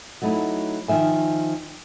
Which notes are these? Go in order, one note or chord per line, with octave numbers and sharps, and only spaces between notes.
F#3 A3 D#4 E4
D#3 F3 E5 G#5